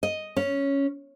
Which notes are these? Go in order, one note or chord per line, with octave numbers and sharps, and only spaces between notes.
D#5
C#4